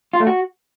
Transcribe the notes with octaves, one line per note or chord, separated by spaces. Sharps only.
F4
A3
F#4